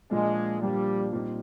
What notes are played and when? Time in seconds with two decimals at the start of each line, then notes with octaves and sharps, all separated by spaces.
0.10 A#2 F3 G#3 A#3 D4
0.61 A#2 F3 G3 A#3 D4
1.13 A#2 G3 C4 D#4